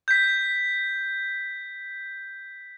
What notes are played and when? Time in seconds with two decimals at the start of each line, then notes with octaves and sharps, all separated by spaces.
0.08 G6 B6